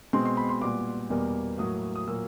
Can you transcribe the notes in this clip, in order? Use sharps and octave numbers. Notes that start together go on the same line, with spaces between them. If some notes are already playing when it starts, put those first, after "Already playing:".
B2 G#3 C4 C6
C6
B5
C6
A#2 G3 B3 D6
E2 B2 G3 A#3
A2 F#3 A#3 D#6
D#6
A#2 F#3 A#3 E6